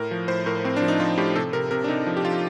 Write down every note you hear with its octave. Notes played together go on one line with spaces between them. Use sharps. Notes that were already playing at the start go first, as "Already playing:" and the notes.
Already playing: A2 A#4
F3
A2 C5
A2 A#4
A2 C4
D4
F3
D#4
F3 F4
A2 G4
C3 A4
C3 A#4
C3 A#4
D4
C3 D#4
F3
G4
F3 F4